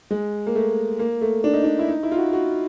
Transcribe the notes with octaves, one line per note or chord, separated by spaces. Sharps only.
G#3
A#3
A3
A#3
A3
D4
D#4
D4
E4
D#4
E4
F4
F#4
F#4